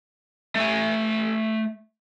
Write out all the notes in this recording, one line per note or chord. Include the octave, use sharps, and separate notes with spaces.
A3 G#5